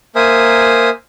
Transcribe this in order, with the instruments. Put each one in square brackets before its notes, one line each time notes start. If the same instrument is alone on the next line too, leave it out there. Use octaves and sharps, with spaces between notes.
[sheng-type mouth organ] A#3 A#4 C5 E5 G#5 D#6